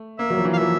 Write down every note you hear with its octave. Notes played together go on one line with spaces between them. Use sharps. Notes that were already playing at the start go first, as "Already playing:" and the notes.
Already playing: A3
A#3 E5
F#3
F3
E3
F5
F3 E5